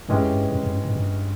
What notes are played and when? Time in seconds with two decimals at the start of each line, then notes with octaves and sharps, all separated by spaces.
0.09 G2 E3 G#3 C#4 G4
0.20 F2
0.33 G2
0.52 F2
0.63 F2
0.73 G2
0.85 G#2
0.96 G2